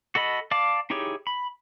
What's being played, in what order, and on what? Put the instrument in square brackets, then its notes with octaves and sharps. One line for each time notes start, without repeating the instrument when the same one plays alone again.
[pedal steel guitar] F#4 A4 D#5 B5
D5 F5 A5 D6
D#4 E4 G4 G#4 C#5
B5